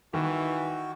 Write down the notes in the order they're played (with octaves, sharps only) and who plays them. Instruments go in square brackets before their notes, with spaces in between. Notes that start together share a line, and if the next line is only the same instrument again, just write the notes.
[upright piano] D#3 [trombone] E3 [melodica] F#4